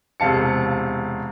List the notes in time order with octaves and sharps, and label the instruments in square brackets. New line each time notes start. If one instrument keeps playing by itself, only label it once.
[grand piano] E1 C3 F5 A5 C#7